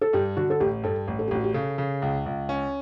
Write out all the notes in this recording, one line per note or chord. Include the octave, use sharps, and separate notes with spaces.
A4
G2 G4
D3 F#4
A4
A1 G4
G2 A4
A1
A4
G4
A1 F#4
G4
C#3 A4
C#3
C#2
C#2
C#4